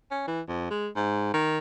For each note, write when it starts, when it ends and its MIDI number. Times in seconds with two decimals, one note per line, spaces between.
0.11 0.24 61
0.27 0.41 52
0.48 0.67 41
0.70 0.88 56
0.96 1.32 44
1.33 1.58 51